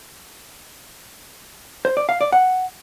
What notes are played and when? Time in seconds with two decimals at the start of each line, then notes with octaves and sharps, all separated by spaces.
1.85 C5
1.97 D5
2.09 F5
2.21 D5
2.32 F#5